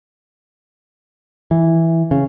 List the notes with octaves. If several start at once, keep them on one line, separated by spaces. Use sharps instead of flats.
E3
C#3